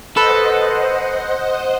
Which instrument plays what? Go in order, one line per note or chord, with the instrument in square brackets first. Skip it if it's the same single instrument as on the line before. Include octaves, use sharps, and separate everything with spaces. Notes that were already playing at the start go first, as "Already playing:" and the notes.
[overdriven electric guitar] A4 [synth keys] B4 B5 E6 [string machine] C5 D#5 F#5